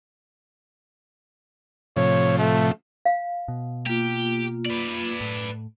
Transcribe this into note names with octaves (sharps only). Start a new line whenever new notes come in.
A2 C3 F3 C#5
A3
F5
B2
A#3 F4 G4
B4 D5
A2